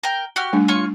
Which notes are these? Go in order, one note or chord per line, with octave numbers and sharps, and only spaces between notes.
A#4 G5
F#4 G4 F6
G3 A3 D4
F4 C#5 C#6